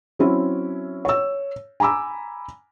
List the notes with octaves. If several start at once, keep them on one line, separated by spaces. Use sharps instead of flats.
F#3 C4 C#4 E4
C#5 E6
G#5 A#5 B5 D6 E6